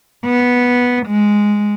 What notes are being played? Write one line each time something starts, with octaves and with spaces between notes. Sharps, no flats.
B3
G#3